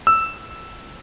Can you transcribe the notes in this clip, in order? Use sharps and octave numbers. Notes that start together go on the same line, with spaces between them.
E6